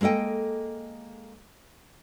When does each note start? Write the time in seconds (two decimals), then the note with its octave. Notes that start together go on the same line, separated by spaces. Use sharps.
0.01 G#3 A#3 A4 D#5 G5